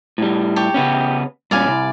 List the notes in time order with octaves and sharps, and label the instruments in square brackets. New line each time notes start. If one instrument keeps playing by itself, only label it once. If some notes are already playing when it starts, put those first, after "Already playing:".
[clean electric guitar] A2 G3
[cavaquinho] G4 A5 C#6
[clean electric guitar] C#3 B3 C#4
[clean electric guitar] G2 A#2 C#4 [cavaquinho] D5 F5 G#5
[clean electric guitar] C2